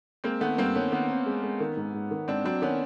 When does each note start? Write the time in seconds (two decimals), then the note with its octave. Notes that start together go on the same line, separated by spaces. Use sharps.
0.24 G#3 A#3 C4
0.41 D#3 A3 B3
0.58 G2 A#3 C4
0.75 D#3 B3 C#4
0.92 D#3 B3 C#4
1.09 C4
1.26 G#3
1.43 G#3
1.60 D#3
1.77 G#2
1.94 G#2
2.11 D#3
2.28 G#2 C4 D4
2.44 F#3 C4 D4
2.62 D#3 B3 C#4